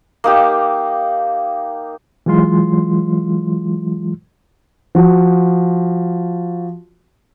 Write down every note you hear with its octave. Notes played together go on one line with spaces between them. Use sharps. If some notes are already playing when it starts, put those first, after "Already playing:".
A#3 D#4 G4
E3 F#3 G#3 F4 C6
F3 F#4